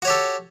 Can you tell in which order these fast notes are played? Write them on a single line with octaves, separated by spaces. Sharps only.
F#4 C#5 G4 A4